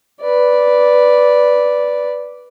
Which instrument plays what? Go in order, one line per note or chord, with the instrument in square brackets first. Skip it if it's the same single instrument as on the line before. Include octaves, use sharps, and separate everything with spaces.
[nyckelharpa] B4 D5